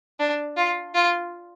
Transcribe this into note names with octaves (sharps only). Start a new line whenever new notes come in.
D4
F4
F4